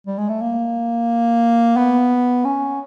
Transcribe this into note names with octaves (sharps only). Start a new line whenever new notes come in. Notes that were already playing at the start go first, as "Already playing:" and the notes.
G3
G#3
A3
A#3
B3
C#4